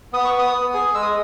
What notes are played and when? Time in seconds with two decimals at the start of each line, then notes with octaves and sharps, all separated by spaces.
0.13 B3 D#6
0.25 C#6
0.34 B3 D#6
0.53 B3
0.74 G#4
0.94 G#3 E6
1.02 D#6